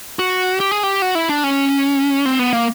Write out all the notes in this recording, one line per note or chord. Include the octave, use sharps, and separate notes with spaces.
F#4
G4
G#4
G4
F#4
E4
D4
C#4
C4
B3
A#3